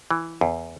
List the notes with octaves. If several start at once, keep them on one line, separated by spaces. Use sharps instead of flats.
E3
E2